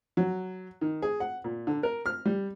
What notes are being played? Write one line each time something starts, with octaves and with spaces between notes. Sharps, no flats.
F#3
D#3
G#4
F#5
A#2
D3
A#4
F6
G3